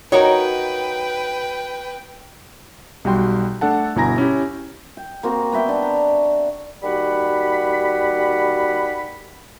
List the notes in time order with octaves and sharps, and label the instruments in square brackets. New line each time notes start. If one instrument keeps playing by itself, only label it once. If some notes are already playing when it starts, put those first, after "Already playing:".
[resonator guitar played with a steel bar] D#4 F#4 A#4 [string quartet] B4 G5 [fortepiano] C#5
[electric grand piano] B1 G3 F#4 G5 C6
A3 D4 A4 F#5 A5
G1 B2 E4 G#5 A#5 A#6
C#4 E4 G4
[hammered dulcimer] G5
A#3 C4 F#4
B3 F#4 E5 G5
D4
A#5
[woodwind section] D#2 G3 F#4 F#5 B5